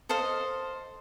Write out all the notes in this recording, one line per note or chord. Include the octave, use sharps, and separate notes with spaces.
A4 C5 D#5 F5